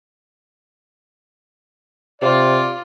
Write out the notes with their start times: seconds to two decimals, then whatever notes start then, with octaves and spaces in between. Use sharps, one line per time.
2.22 C3 F4 D5